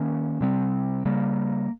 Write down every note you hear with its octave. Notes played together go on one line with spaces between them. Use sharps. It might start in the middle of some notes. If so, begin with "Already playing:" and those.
Already playing: D#3 A#3 C#4
C3 G3 C4
C#3 G3 A#3